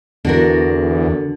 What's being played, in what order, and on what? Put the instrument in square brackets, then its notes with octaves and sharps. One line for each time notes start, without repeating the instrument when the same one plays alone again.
[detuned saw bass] E2 [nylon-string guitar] D3 F#4 A#4